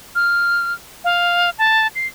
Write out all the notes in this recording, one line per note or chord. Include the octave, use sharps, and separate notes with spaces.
F6
F5
A5
C7